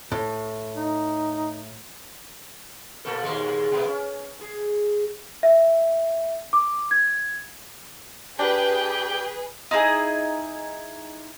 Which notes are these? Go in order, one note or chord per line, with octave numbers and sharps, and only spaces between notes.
A2
D#4
A#2 A#3 A4
D#2 A#2 G#3
B2 A3 B3
C#4
G#4
E5
D6
G#6
D4 G4 G#4 B4 G5
D#4 E4 G#4